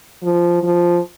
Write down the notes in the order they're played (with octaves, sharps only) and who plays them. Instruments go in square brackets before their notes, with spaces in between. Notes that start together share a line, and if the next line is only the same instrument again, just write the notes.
[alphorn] F3
F3